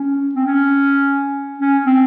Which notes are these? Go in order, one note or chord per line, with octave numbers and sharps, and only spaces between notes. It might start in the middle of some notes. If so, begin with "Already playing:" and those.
Already playing: C#4
C4
C#4
C#4
C4